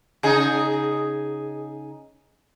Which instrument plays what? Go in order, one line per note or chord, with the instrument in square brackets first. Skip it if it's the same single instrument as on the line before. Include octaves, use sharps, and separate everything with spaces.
[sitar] C#3 D#4 G#4